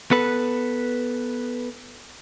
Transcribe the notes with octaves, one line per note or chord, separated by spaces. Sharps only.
B3 A4 B4